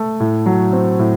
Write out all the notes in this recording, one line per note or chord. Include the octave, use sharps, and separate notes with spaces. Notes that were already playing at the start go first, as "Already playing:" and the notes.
Already playing: A3
A2
F#3
C4
A2